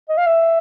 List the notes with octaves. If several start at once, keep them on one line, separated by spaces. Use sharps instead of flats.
D#5
F5
E5